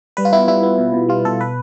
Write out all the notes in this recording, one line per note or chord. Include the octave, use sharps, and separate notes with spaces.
G3 B4
F4
B3 E4
G3 E4
B3
B2
B2
G3 F4
B2 A4
B4